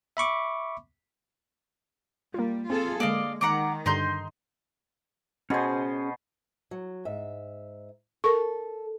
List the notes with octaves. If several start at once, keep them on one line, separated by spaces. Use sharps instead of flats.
E5 B5 C#6 D6
G3 A#3 F4
C4 F4 G#4 A4
D3 G#3 A#3 D5 D#5 F5
D#3 F#5 A#5 D6
G2 D3 D#4 C6 G6
B2 C#4 G#4 C5 G#5
F#3
G#2 E5
A4 A#4 C#6